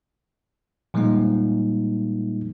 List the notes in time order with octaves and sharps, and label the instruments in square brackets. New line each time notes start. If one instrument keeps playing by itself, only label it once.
[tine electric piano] A#2 F3 G3 G#3 A#3 D#4